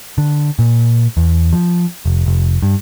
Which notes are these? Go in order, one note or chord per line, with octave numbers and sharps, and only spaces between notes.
D3
A#2
E2
F3
F1
F1
G2